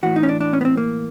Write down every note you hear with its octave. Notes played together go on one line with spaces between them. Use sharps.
A2 E3 F#4
D#4
C#4
D4
D4
C#4
B3
C4
A#3